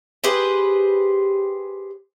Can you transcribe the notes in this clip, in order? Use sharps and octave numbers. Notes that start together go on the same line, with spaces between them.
G4 G#4 B4 C5